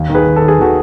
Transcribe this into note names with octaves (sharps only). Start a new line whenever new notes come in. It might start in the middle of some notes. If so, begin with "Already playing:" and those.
Already playing: D#2
D#3
G#4 B4
D#3
A4
D#3
G#4
D#3 F#4 A4